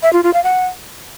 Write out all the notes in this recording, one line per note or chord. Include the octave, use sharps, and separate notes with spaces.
E5
F4
F4
F5
F#5